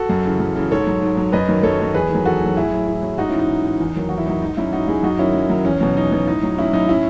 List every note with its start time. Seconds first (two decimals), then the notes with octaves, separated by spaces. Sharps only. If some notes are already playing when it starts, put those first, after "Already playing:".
Already playing: F#4 A4
0.09 F#2
0.25 C#3 E3
0.40 F#2
0.56 C#3 E3
0.71 G#2 A4 C#5
0.87 F#3
1.02 G#2
1.17 F#3
1.32 F#2 B4 D#5
1.48 D#3 F#3
1.63 F#2 A4 C#5
1.79 D#3 F#3
1.94 E2 G#4 B4
2.10 D#3
2.15 F#3
2.26 E2 F#4 A4
2.41 D#3 F#3
2.57 A2 E4 G#4
2.72 F#3
2.88 A2
3.03 F#3
3.18 G#2 D#4 F#4
3.29 C#4 E4
3.34 E3 D#4
3.49 G#2
3.65 E3
3.80 E2
3.96 D#3 F#3
4.09 E2 F#4
4.18 E4
4.26 D#3 F#3 D#4
4.42 G#2 D#4
4.57 F#3 C#4 E4
4.73 G#2 D#4 F#4
4.88 F#3 E4 G#4
5.03 F#2 D#4 F#4
5.18 D#3 F#3 C#4 E4
5.34 F#2
5.50 D#3 F#3
5.65 E2 C#4
5.80 B2 F#3
5.96 E2 D#4
6.12 B2 F#3
6.27 A2 D#4
6.43 F#3
6.58 A2 C#4 E4
6.73 F#3 D#4
6.88 A2 C#4 E4